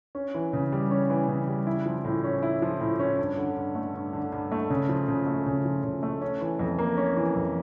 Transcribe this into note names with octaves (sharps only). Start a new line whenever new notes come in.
C#4
E3
C#3
G3
C#4
E3
C#3
G3
E4
F3
A2
C#4
E4
F3
A2
C#4
G2
D3
G2
A3
G2
D3
G2
A3
C#3
F3
C#3
A3
C#3
F3
C#3
A3
C#4
E3
F2
A#3
C#4
E3
F2